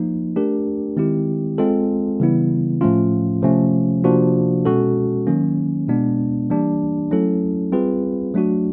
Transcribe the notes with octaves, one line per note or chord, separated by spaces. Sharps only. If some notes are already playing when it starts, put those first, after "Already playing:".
Already playing: F3 A#3 D#4
A3 D4 G4 A#4
D#3 G#3 C4 E4 G4
G#3 C4 F4 A4
C#3 E3 G3 B3 E4
A2 F3 A3 C#4 F4
C3 F3 A3 C#4
C3 F3 A#3 D4 F#4
B2 G#3 C#4 F#4 A4
D#3 F#3 A#3 C#4
B2 G#3 B3 D4
E3 G3 A#3 D4 G4
F#3 A3 C#4 E4 A4
G3 C4 F4 G#4 B4
F#3 A3 D4 F#4